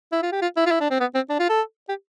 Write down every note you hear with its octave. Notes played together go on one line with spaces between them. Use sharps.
E4
F4
G4
F4
E4
F4
E4
D4
C4
B3
C4
D4
F4
A4
G4